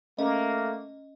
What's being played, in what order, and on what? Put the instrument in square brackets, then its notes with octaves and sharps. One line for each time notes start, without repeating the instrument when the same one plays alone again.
[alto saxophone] A3 [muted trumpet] A#3 [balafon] C#4 [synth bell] D#5